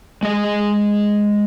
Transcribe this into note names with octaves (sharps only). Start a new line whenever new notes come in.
G#3 D#5